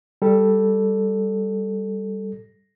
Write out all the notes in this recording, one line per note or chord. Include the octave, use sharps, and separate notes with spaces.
G3 A4